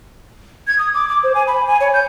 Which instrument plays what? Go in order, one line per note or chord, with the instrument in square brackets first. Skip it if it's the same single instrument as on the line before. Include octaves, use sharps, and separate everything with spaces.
[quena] G#6
D#6
D6
D6
C5
G#5
B5
G#5
C#5
G6